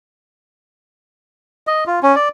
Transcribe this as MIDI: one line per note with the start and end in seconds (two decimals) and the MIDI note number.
1.67 1.84 75
1.87 1.99 65
2.03 2.15 61
2.15 2.29 74